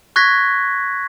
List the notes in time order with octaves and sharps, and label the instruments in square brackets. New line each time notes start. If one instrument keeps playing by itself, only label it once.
[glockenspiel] C#6 F#6 G#6 A#6 B6